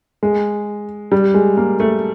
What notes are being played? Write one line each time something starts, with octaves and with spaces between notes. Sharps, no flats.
G#3
G3
G#3
A#3
A3